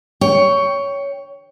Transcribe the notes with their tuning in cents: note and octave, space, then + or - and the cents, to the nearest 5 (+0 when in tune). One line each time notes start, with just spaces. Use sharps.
C#5 +15 G5 +5